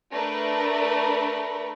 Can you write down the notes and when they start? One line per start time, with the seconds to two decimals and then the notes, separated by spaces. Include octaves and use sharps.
0.11 A3 D4 A#4 B4